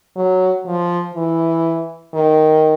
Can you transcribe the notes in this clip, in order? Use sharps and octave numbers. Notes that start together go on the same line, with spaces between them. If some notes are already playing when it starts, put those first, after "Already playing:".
F#3
F3
E3
D#3